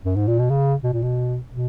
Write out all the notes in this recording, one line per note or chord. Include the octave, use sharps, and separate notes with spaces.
F#2
G#2
A#2
B2
C#3
B2
A#2
B2
B2